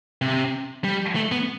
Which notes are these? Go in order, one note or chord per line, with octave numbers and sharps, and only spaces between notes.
C3
G3
A3
B3